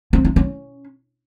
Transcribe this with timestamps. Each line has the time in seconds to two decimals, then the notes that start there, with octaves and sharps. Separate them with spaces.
0.13 C4
0.25 E4
0.36 C#4